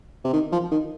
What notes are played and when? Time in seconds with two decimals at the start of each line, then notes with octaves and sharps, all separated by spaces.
0.24 C3
0.33 D#3
0.52 F3
0.71 D#3